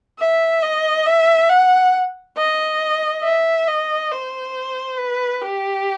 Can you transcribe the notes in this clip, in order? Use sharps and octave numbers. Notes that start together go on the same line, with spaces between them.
E5
D#5
E5
F#5
D#5
E5
D#5
C5
B4
G4